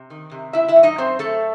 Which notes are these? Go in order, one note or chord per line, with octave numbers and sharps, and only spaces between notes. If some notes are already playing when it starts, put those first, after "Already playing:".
Already playing: C3
D#3
C3
F#2 E4 E5
E4 E5
F#2
D#4 D#5
F#2 C4 C5
F#2 A3 A4